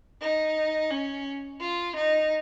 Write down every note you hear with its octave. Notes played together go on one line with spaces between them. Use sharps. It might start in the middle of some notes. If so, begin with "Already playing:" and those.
D#4
C#4
F4
D#4